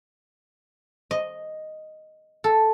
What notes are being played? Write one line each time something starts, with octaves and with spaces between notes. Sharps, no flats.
D#5
A4